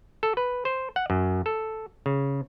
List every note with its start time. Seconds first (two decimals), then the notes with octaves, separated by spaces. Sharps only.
0.23 A4
0.37 B4
0.65 C5
0.96 F#5
1.10 F#2
1.46 A4
2.06 C#3